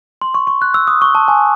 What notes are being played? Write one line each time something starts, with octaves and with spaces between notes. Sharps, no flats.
C6
C#6
C#6
F#6
E6
D#6
C#6
A5
G#5